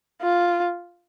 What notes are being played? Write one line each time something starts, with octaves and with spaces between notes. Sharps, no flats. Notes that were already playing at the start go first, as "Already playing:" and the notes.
F4